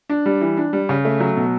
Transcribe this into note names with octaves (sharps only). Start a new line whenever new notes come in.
D4
G3
E3
D4
G3
C#3
A3
F#3
B2